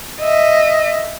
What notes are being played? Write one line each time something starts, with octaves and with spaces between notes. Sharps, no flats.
D#5 E5